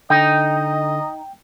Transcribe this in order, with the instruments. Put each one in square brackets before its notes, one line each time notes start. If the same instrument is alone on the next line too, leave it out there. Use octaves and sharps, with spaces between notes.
[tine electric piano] D3 [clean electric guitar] D#4 [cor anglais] D#5 [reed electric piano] G5